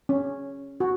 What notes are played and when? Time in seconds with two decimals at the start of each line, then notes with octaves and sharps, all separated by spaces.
0.09 C#4
0.80 F#4